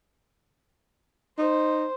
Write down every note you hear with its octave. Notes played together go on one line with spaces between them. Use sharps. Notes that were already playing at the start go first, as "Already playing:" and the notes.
D#4 C5